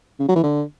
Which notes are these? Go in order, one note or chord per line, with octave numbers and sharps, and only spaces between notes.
C#3
F#3
E3
D3